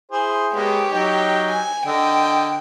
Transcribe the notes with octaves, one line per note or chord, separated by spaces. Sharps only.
E4 G#4 C5
G#3 A#3 B3 G4 C#5
F#3 D#4 G5
G#5
D3 D#5 G5